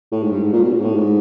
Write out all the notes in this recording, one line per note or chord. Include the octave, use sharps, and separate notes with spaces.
A2
G#2
G2
G#2
A#2
B2
A#2
G#2
A2
G#2